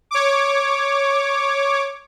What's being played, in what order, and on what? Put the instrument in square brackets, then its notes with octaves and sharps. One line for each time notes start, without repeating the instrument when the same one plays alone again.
[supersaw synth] C#5 D6